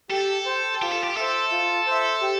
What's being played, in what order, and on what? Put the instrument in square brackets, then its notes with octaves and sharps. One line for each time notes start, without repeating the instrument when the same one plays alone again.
[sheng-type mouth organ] G4 [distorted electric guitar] A4
[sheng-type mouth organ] C5 G5
[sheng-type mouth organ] F4 [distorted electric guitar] G4
[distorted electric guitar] A4
G4
[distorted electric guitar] A4 [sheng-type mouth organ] C5 E5
[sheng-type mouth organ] F4
C5 E5
G4